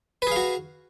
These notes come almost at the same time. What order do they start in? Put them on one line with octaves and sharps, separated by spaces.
B4 G#4 F5 F#4